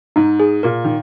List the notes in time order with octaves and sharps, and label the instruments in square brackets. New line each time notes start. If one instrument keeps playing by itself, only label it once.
[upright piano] G#2 [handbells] D#4
[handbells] G#4
[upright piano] A#2 [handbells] A#4
[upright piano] D#3